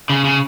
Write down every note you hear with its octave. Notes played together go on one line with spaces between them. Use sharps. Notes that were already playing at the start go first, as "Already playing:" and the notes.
C#3
C#3